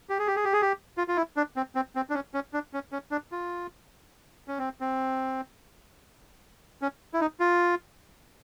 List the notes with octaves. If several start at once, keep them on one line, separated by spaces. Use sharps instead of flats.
G4
G#4
G4
G#4
G4
G#4
G4
F4
F4
E4
D4
C4
C4
C4
D4
C#4
C#4
D4
C#4
C#4
D4
F4
C#4
C4
C4
C#4
E4
D#4
F4